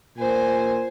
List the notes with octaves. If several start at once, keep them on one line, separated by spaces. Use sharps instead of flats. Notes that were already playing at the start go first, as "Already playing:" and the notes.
A#2 C5 G#5